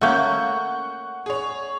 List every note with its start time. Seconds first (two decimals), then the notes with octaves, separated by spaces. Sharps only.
0.01 A3 A#3 C#4 F#5 C#6 G6
1.26 G#4 C#5